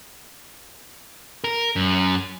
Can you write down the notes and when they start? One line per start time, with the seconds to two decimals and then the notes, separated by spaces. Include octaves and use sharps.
1.44 A#4
1.76 F#2